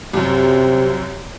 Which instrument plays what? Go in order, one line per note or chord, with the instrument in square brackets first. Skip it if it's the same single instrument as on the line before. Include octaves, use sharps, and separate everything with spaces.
[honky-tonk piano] C2 F#2 [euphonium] C3